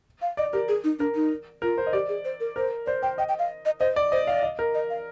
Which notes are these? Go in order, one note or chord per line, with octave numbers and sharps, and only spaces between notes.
F5
D5 D#5
G4 A#4
G#4
D#4
D4 A#4
D#4
F4 A#4
C5
D#5
G4 D5
G#4
C5
A#4
A#4 C5
C5 D5
C5 G5
D#5 G5
G5
F5
D#5
C5 D#5
D5
C5 D#5
D5 F5
D#5
A#4
D#5
F5